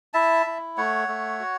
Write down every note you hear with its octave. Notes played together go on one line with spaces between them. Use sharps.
E4 E5 A5
E4
A3 C#5 F#5
A3
F#4